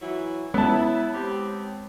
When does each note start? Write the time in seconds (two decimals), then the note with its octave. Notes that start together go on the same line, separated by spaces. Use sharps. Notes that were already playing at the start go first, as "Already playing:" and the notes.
0.01 E3 F#3 E4
0.54 G#3 B3 E4 A5
1.14 C4 G4